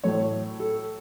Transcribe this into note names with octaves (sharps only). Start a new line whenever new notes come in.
A2 F#3 A3 C#5
A4